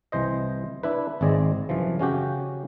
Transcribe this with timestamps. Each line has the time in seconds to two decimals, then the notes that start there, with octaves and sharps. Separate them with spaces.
0.12 C2 E3 C5 D#5
0.83 D4 E4 B4
1.21 G#1 C4 G#4 D5 D#5
1.69 F#2 C3 E3 F3
1.99 C#3 C#4 F#4 G4